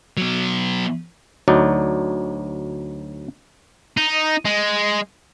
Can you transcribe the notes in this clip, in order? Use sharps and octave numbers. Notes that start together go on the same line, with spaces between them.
F#3 B3
D2 F#3 D#4 D5
D#4
G#3